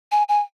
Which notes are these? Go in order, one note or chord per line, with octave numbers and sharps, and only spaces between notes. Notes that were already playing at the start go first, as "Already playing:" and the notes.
G#5
G#5